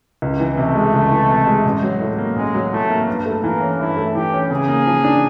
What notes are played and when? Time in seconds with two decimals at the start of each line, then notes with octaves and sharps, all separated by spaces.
0.22 C#2
0.40 E3
0.57 C3 A3
0.75 G#3
0.94 C#2
1.11 E3
1.29 C3
1.47 G#3
1.65 A1
1.83 F#3
2.01 A2
2.18 A#3
2.36 A1 G#3
2.54 F#3
2.73 A2 A3
2.90 A#3
3.08 G2
3.26 A3
3.44 E3 A#3
3.61 C#4
3.79 G2 E4
3.97 A3
4.14 E3 G4
4.33 C#4
4.51 C#3 G#4
4.68 A#3
4.87 F3
5.04 D4